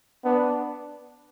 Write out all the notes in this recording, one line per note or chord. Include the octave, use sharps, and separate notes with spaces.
B3 D4